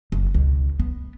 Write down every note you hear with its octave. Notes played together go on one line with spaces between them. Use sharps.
F#1
C#2 B2
B3